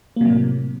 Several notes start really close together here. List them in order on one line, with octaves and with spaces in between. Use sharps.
A#3 C3 F#3 A2